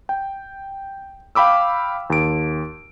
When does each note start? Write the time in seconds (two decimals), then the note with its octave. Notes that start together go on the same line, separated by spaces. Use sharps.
0.09 G5
1.35 F5 G5 B5 D6 E6
2.10 D#2 D7